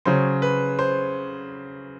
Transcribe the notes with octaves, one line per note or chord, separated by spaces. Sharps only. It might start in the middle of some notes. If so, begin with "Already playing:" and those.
C#3 F#3 C5
B4
C5